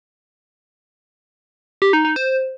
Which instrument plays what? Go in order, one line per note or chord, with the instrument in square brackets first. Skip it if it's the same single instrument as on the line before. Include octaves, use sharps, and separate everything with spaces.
[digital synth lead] G4
D#4
D#4
C5